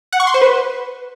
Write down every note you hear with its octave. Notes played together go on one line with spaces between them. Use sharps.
F#5
C#6
C6
C5
B4